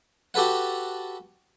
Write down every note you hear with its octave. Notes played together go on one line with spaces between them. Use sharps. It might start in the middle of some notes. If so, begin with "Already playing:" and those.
F#4 G4 A4 B4 F#5